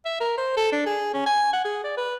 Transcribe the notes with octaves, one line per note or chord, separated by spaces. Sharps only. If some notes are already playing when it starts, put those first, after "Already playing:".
E5
A#4
C5
A4
D4
G#4
C#4
G#5
F#5
G#4
D5
B4